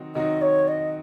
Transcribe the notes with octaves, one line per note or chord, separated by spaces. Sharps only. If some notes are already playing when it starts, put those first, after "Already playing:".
Already playing: D#3 F#3 C4 D#4 F#4
D#3 F#3 C4 D#4 F#4 D#5
C#5
D#5